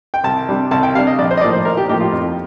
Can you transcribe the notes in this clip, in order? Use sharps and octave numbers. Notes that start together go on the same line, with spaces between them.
G5
C2 A5
C3 G3 D4
C2 A5
G5
C3 G3 D4 F5
D#5
A#1 D5
C5
D#5
A2 F3 A#3 D#4 D5
C5
A#1 A#4
G4
A2 F3 A#3 D#4 G4
F4
F2